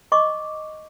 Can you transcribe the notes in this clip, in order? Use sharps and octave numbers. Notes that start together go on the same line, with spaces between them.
D#5 C#6 D6